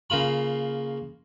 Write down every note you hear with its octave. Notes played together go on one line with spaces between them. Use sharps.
C#3 A#3 F4 B5